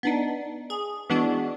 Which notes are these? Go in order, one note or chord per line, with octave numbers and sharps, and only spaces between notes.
B3 D4 D#4
G#4
E3 G#3 B3 D4 F#4